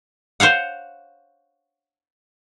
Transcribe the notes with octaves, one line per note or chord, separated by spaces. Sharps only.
C5 C#5 F5 F#5